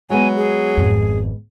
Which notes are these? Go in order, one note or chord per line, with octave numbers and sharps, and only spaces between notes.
F#3 G#3 B3 G#5
G#4
G#1 F2